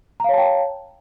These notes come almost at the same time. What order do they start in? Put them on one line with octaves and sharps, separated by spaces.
A#5 F5 C#5 A5 G5